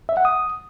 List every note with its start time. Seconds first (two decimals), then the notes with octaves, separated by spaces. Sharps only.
0.09 E5
0.17 F#5
0.25 D#6